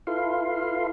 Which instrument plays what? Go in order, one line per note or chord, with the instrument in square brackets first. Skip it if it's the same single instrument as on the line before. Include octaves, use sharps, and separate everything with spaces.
[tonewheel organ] E4 F4 A4 B4 F5 C6